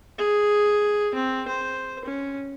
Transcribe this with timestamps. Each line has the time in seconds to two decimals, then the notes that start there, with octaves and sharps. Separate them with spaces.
0.19 G#4
1.15 C4
1.48 C5
2.05 C#4